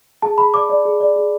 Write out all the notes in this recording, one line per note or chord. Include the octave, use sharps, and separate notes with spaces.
G#4 A5
G#4 B5
D5 D6
D5
G#4
D5
G#4